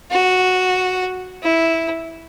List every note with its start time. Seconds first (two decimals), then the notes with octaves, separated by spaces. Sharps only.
0.11 F#4
1.42 E4